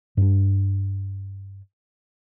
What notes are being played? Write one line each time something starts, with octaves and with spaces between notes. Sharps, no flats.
G2 D4